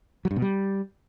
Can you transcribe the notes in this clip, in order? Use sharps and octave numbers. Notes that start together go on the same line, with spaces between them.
F#3
G2
B2
G3